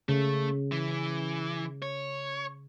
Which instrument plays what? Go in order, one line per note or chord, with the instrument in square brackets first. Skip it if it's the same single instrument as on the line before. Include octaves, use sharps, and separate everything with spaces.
[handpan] C#3 [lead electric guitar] A3
[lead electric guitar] E3
C#5